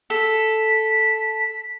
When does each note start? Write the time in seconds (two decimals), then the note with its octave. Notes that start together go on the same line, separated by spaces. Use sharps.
0.10 A4 B6